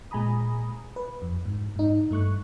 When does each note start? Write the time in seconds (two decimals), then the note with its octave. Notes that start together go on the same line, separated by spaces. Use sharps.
0.11 A#2 G#3 G#5 A#5 B5 D#6
0.96 B4
1.22 F2
1.45 G#2
1.76 G#2 D#4
2.11 G2 A3 C#6 F#6